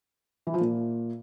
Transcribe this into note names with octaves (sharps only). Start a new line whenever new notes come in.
E3
F3
A#2